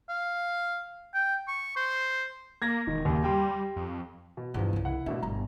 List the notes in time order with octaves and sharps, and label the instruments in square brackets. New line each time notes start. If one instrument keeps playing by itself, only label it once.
[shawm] F5
G5
C#6
C5
[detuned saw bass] A#3 [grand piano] G#6 A#6
[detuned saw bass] E1 [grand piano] D#3
[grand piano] D#2 [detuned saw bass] C#3
[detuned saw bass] G3 [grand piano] G4 G5 C6
[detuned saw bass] F2
[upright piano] B2
[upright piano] E2 F3 [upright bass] G2 E3
[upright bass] C2 C#3
[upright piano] E4 F#5
[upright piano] A1 B2 E5 [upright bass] D4
[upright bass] G1 G2 [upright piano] A#5